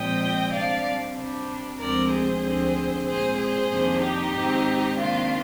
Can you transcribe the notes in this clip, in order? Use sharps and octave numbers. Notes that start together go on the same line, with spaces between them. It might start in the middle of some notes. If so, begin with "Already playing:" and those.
Already playing: A#2 F3 G#3 C4 D#5 G5
C3 G3 D4 D5 F5
C3 G3 D4
D2 C3 F3 G#3 C4 A#4 D5
G#4 C5
D2 D3 F3 C4
A#2 G#3 C4 G#4 C5
G#4 C5
F2 C3 D#3 A#3 D4
D#4 G4
G#2 D#3 G#3 C4
C3 D#3 A#3 D4 F4